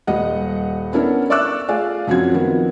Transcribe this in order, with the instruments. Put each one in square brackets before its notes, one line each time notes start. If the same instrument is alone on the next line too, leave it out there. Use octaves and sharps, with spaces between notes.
[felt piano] D#1 G3 D#5 F#5
B3 C#4 D4 E4 A4 A#4
D5 E5 C#6 D6 E6 F#6
A3 F4 G#4 D5 F5 G#5
F#2 F3 C4 C#4 F#4 G#6
D#3 F3 B3 C4